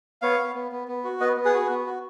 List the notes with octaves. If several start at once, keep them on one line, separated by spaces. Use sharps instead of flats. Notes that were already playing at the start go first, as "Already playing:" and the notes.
B3 C#5 F5
B3
B3
B3
B3
F#4
B3 B4 D#5
B3
G#4 B4
F#4
B3
F#4